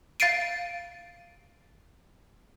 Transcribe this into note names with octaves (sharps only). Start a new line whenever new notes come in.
F5 A6 C7 D7 D#7